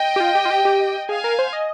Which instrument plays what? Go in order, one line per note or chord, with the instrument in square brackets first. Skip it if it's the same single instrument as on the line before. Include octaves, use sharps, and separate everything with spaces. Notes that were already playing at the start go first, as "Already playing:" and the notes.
Already playing: [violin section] D#5 G5
[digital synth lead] G4
F4
G4
F4
G4
G4
[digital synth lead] G#4 [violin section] F5 G#5
[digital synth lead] A#4
C5
D#5